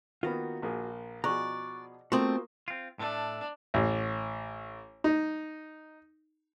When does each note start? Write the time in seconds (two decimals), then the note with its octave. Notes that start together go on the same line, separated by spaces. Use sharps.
0.23 D#3 A#3 B3 F4 F#4
0.62 A#1 A#3 G#4
1.24 B2 F3 G#4 D5 A#5 C#6 F#6
2.12 A3 A#3 C4 F4 F#4 C6 C#6 D#6
2.68 C4 F4
2.99 A2 A3 D4
3.74 A1
5.04 D#4